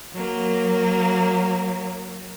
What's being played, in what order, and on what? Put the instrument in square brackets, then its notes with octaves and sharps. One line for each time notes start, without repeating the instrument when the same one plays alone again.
[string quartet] F#3 A#3